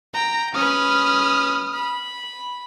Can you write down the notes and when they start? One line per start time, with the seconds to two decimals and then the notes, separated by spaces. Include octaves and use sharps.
0.14 G5 A#5
0.54 C#4 B4 D#6 F6
1.74 B5